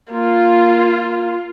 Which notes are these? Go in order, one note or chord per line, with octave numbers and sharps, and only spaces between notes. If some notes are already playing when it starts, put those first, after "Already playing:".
A#3 F4